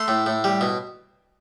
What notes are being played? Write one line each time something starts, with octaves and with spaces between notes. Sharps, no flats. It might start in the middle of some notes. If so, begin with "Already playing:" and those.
Already playing: A3 C6
A2
A2
G3
B2